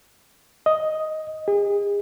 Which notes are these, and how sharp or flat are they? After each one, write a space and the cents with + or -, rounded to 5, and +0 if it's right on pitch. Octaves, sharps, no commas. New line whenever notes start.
D#5 +5
G#4 -40